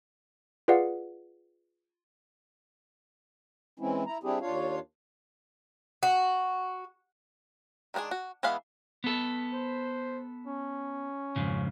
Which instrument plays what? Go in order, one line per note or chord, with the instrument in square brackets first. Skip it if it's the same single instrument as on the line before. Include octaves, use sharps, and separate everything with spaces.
[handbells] F4 G#4 B4 D5 F5 F#5
[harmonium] E3 G#3 C4 C#4 E4
E4 A#5
G3 C4 D4 E4 G4 G#4
D#2 D4 F4 C#5 F5
[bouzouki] F#4
[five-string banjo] D#3 G#3 C4 D4 G#4
F#4
E3 G#3 B3 F5 B5
[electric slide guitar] B3 A4
[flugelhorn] C5
C#4
[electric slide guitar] F2 G#2 C#3